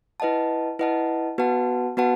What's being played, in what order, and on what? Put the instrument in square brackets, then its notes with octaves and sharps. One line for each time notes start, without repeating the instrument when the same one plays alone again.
[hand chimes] E4 B4 D#5 F#5 A5
E4 B4 D#5 F#5 A5
B3 F#4 B4 F#5 A5
B3 F#4 B4 F#5 A5